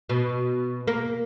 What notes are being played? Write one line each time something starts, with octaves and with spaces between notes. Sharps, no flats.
B2
A#3